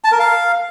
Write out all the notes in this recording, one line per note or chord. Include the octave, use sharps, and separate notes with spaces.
A5
A#4
F5